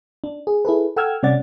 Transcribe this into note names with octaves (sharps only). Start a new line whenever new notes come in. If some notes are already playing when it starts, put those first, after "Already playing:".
D4
G#4
E4 G#4 A4 B4
A4 F#5 G5 E6 F6 G#6
C3 G3 C#4 D5 F#5 A6